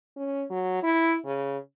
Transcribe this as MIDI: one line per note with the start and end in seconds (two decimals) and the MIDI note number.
0.17 0.44 61
0.50 0.81 54
0.83 1.17 64
1.25 1.58 49